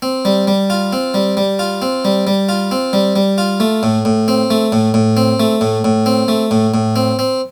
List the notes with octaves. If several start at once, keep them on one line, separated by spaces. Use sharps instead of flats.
C4
G3
G3
F4
C4
G3
G3
F4
C4
G3
G3
F4
C4
G3
G3
F4
A3
A2
A2
C4
A3
A2
A2
C4
A3
A2
A2
C4
A3
A2
A2
C4
C4